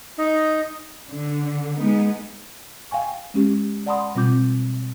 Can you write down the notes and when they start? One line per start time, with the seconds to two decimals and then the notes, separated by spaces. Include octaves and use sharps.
0.18 D#4
1.10 D3
1.76 G#3 B3 D#4
2.91 F5 G5 G#5 C#6
3.34 G#3 C#4 G4
3.86 D5 F#5 A5 B5 C6 D#6
4.15 B2 G3 C4 F4 D6 G6